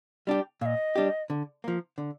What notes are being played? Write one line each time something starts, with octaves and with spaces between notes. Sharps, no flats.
G3 D4 G4
A#2 D#5 F5
G3 D4 G4
D3
F3 A#3
D3